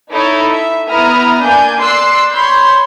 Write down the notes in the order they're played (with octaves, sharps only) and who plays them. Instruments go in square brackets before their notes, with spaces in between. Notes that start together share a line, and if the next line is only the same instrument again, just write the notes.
[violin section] D#4 E4 A4 C#5
E5
B3 E4 B4 A#5 D#6 F6
A#3 D4 D5 G#5 G6
D5 C6 E6 F#6 C7
C#5 B5 C6 G6